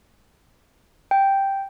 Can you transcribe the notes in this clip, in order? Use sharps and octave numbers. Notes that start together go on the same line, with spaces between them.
G5